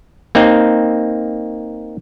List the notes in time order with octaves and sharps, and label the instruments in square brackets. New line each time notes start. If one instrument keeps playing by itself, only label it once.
[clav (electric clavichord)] A#3 C4 D#4